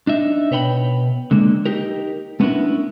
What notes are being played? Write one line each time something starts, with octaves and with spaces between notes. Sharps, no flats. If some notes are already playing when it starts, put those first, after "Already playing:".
D4 D#4 E5
B2 B4 C#5 G5 B5
D3 G#3 A#3
D#4 G4 A#4
A3 B3 C#4 D4 E4 A#4